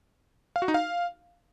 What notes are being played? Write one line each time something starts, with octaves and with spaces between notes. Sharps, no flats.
F5
F#4
D#4
F5